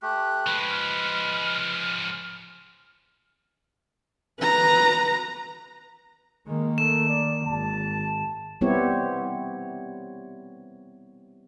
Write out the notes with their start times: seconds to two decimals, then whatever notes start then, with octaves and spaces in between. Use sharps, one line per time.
0.02 A3 G4 F#6
0.47 F3 G#3 B4
0.70 F6
4.41 B4 A#5
6.47 D#3 G#3 A#3
6.78 A3 E7
7.09 D5
7.47 G#1 A5
8.61 G3 B3 C4 E4 G4 C#5